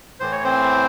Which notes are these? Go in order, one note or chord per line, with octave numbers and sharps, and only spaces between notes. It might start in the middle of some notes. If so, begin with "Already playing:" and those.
A2 E3 C5
C#5
C4 C5